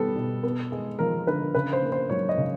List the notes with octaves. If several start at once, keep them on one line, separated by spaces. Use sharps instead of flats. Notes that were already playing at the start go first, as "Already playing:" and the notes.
Already playing: G3 B3 A4
B2
B3
G#3
F3 A#4
D3 B4
C#3 B4
C5
A#3
C5
F#3 C#5
D#5
C#3